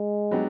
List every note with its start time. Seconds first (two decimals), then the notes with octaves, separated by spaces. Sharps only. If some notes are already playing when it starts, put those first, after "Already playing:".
Already playing: G#3
0.31 F#3 B3 D4 G4